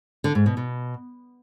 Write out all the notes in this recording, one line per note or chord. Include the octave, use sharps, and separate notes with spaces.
D3
G#2
B2
B2